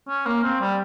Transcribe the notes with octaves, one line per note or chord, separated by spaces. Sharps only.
C#4
A#3
C4
G3